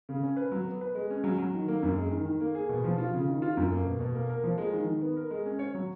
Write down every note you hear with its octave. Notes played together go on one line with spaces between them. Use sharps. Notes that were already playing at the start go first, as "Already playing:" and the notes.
C#3
C#4
B4
F#3
B3
B4
G#3
C#4
F#3
F#3
D#3
A#3
F#2
G#3
D#3
D#3
A#3
G#4
B2
F3
F4
C#3
D#3
F4
F#2
A#3
B2
B2
A#3
A#4
F3
G#3
D#3
D#3
B3
A#4
G#3
C#4
C#5
F#3